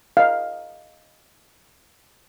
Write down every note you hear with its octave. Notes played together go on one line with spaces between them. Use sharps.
D#5 F5